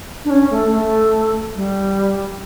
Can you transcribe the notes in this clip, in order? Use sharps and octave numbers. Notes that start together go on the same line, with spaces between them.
D4
C#4
A3
A3
G3